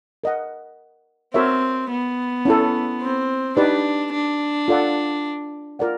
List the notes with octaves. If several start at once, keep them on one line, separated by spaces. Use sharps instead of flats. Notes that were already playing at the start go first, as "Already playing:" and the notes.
A#4 D#5 F#5
C4 F#4 A#4 C#5 E5
B3
C#4 E4 A4
C4
D4 D#4 G4 B4 D5
D4
F4 A4 D5 F#5
F4 A#4 D5 F#5